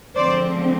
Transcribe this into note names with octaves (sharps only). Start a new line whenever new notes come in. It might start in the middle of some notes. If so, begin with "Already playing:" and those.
D3 F3 G#3 C4 C5 D5